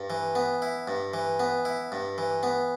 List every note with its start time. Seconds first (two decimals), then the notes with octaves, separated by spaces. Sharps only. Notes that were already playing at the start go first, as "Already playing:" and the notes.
Already playing: G2
0.10 E3
0.35 B3
0.62 E4
0.88 G2
1.14 E3
1.40 B3
1.65 E4
1.92 G2
2.18 E3
2.43 B3